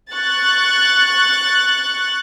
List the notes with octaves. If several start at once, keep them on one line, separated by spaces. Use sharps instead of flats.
C#6 F#6 A6